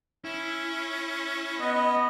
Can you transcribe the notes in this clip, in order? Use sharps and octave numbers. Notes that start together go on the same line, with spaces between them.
C#4 E4
B3 D#5